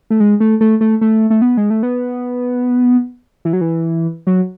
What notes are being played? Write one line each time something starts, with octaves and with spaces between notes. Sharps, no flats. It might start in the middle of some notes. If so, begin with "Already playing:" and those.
A3
G#3
A3
A3
A3
A3
A3
B3
G#3
A3
B3
E3
F#3
E3
F#3